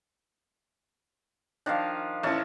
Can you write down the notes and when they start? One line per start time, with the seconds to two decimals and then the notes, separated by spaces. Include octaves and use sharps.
1.66 D#3 F3 D4 F5 A#5
2.23 A1 E3 C#4 A4 A#4